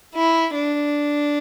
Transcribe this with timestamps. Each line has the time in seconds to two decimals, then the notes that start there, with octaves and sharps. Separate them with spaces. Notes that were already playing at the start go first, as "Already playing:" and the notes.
0.14 E4
0.55 D4